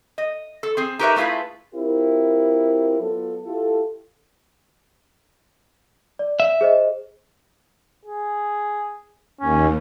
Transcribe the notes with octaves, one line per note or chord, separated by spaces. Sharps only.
D#5
A4
C4 G#4
D#4 G4 A#4 B4 C#5 E5
A3 E4 F4 G#4 B4
C4 E4 F4 G4 A#4
F#3 B3 F4 A4
E4 F4 G4 A4
D5
E5
G#4 C5 D#5
G#4
D#2 C#4